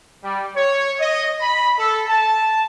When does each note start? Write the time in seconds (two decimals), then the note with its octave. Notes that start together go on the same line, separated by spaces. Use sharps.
0.23 G3
0.55 C#5
0.99 D#5
1.41 B5
1.77 A4
2.08 A5